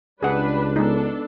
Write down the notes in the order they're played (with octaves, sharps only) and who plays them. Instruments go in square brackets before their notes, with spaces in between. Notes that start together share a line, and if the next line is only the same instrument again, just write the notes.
[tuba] C#2 [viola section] G3 D4 B4 [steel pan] G#4 F#5
[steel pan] G#3 D#4 [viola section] B3 D4 A4